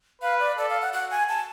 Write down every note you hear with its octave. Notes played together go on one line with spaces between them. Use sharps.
B4 F5
D5
A4 D5
F5
F#5
F#4 F#5
G#5
A5